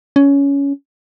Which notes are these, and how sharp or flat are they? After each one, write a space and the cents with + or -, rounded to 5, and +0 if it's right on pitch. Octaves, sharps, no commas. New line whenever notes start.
C#4 +15